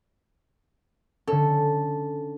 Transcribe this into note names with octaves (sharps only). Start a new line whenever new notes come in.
D3 C#4 A4